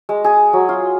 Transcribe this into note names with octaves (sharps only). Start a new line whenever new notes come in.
G#3
G#4
F#3
F4